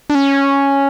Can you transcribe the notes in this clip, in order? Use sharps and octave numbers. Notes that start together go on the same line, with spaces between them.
D4
C#4